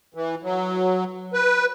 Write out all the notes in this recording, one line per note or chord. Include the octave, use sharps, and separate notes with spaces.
E3
F#3
B4